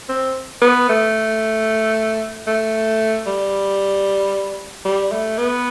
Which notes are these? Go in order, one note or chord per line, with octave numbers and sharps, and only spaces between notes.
C4
B3
A3
A3
G3
G3
A3
B3